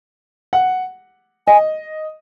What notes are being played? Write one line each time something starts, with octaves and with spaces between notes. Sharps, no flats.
F#5
D#5 G#5